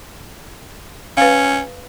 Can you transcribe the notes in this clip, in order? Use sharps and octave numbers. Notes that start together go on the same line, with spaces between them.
C#4 B4 F5